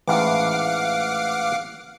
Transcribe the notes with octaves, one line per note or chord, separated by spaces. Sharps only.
A1 G#2 E3 F5 F#5 D6